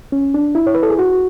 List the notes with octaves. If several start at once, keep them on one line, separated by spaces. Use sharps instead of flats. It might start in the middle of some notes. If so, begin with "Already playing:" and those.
C#4
D4
E4
C#5
B4
A4
G#4
F#4